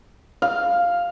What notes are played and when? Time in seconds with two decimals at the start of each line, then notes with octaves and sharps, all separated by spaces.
0.42 F5